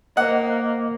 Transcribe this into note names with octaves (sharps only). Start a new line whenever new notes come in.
A#3 C5 D#5 F#5